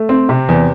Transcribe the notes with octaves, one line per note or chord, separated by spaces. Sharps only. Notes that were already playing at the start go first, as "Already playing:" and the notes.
Already playing: A3
C4
C3
E2